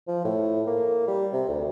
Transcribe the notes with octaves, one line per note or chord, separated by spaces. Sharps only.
F3
A2
A#3
G3
C3
D2